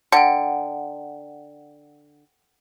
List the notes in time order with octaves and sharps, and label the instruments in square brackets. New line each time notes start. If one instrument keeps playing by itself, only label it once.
[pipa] D3 [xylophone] F#5 G5